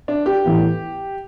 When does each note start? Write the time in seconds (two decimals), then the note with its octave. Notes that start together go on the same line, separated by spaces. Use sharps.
0.08 D4
0.26 G4
0.45 A2 E3 B3